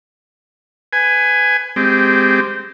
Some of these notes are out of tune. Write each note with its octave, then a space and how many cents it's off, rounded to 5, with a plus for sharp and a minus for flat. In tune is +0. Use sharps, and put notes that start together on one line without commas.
B4 +25 G#5 +0
G#3 +0 C4 -15 G4 +0